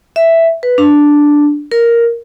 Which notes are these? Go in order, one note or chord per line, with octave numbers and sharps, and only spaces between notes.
E5
B4
D4
A#4